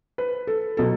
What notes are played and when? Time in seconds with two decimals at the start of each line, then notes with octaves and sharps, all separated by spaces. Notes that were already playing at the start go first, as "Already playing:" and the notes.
0.18 B4
0.47 A4
0.77 B2 F#3 A4